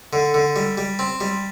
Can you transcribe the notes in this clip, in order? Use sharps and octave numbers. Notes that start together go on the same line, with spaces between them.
D3
D3
G3
G3
C4
G3